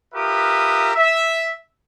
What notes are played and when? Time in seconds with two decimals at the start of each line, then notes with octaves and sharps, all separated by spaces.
0.15 F4 G4 A#4 B4 E5 D#6
0.95 E5